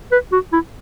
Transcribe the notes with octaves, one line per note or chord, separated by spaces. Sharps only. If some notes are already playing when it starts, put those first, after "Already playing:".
B4
F#4
E4